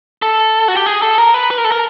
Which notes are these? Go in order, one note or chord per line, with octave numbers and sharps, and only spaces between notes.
A4
F#4
G4
G#4
A4
A#4
B4
B4
A#4
A4
A#4